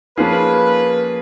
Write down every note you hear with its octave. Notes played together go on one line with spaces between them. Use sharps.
F3 A#3 C#4 F4 G#4 B4